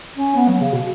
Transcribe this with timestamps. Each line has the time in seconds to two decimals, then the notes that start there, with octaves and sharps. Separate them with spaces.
0.17 C#4
0.36 B3
0.48 F#3
0.61 C#3
0.73 B2